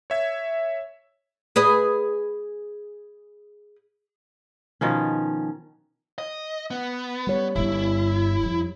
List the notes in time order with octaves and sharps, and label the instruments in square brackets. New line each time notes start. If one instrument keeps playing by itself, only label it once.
[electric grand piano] C#5 E5 G#6
[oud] G#4 B4 D#5
[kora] B2 D#3 F3 C#4
[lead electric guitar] D#5
B3
[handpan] G3 C#5
[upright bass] G1 G2 [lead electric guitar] E4
[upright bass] F2